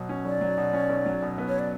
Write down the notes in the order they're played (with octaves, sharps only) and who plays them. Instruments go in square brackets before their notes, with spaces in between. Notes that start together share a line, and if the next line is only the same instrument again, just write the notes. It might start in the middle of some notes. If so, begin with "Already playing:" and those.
Already playing: [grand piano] B2 F#3
C#4
[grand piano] B1 [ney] D5
[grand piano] F#3
B2
C#4
B1
F#3
B2
B3
[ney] C#5
D5